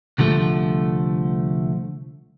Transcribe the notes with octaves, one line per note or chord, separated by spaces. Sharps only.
C2 D3 F3 A3